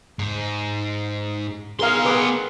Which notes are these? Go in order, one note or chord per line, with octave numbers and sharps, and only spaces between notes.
G#2
B3 G#4 A#4 F5 C6
G#4 B4 D6